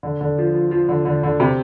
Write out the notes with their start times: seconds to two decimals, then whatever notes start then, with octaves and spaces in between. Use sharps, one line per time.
0.03 D3
0.21 D3
0.38 F3
0.54 F3
0.71 F3
0.89 D3
1.05 D3
1.23 D3
1.40 C3